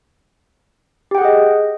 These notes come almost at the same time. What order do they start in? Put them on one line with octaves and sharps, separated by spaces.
G4 G5 F#5 G#4 D#5